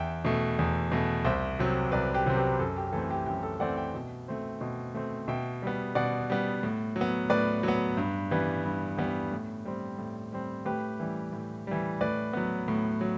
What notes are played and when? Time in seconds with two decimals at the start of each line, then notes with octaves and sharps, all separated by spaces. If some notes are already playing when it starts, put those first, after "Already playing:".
Already playing: E2 E5 G5
0.25 B2 A3
0.59 E2
0.92 B2 A3
1.25 C2 C5 E5
1.59 C3 F#3 C4
1.92 C2 B4 D5
2.14 G4 B4
2.26 C3 F#3 C4
2.37 G4 B4
2.59 F#2 A4
2.77 G4
2.87 G4
2.93 E3 A3 C4 A4
3.10 G4
3.26 F#2 G4
3.43 A4
3.60 E3 A3 C4 D5 F#5
3.77 E5 G5
3.95 B2
4.28 A3 C4
4.61 B2
4.94 A3 C4
5.28 B2 E5 G5
5.62 G3 B3
5.95 B2 D5 F#5
6.30 G3 B3
6.63 A2
6.96 F#3
7.01 B3
7.30 A2 B4 D5
7.63 F#3 B3
7.97 G2
8.31 E3 G3 B3
8.64 G2
8.97 E3 G3 B3
9.32 A2
9.65 G3 C4
9.98 A2
10.32 G3 C4
10.65 A2 G4 B4
11.00 E3 G3
11.32 A2
11.67 E3 G3
12.01 A2 B4 D5
12.33 F#3 B3
12.68 A2
13.01 F#3